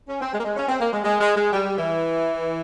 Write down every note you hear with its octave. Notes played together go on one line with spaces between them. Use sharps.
C#4
C4
G#3
A#3
G#3
C#4
C4
A#3
G#3
G#3
G#3
G#3
G3
E3